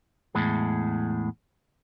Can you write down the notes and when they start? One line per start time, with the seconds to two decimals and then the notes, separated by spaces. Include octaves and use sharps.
0.35 E2 A2 G#3